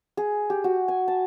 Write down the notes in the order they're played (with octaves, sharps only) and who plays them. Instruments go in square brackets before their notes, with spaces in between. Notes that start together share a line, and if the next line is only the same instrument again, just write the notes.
[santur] G#4
G4
F#4
G#5
A5